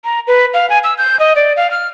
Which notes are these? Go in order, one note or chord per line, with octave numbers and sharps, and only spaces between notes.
A#5
B4
F5
G#5
E6
G6
D#5
D5
F5
F6